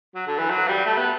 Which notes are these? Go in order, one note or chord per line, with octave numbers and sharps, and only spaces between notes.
F#3
D3
E3
F#3
G3
A3
B3